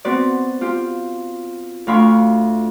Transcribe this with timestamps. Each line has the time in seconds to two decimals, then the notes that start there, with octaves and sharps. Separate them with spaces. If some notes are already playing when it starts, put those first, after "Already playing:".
0.05 B3 C4 F#4 B4 D5
0.61 F4 G4
1.87 D2 F4 F5 B5 C#6 D6